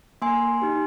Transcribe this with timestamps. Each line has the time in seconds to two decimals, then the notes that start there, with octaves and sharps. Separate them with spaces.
0.22 A#3 G#5 C6
0.62 D#4 G4